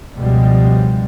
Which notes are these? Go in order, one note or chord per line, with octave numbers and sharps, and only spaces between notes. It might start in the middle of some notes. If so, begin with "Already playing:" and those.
C#2 G2 B2 F3 G3 G#3